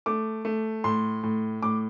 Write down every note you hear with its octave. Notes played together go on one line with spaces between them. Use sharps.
A3 D6
A3
A2 C6
A2
A2 D6